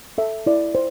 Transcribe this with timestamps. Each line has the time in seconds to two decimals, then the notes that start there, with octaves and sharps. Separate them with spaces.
0.18 A4 E5
0.46 E4 D5
0.75 C5